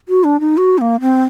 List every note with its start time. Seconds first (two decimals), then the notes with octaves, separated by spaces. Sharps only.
0.09 F#4
0.24 D4
0.40 D#4
0.57 F#4
0.78 C4
0.81 A#3
1.00 C4